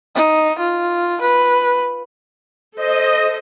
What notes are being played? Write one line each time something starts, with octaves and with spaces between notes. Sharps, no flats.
D#4
F4
B4
A4 C5 D#5